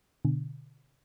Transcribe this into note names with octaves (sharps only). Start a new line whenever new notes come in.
B2 D3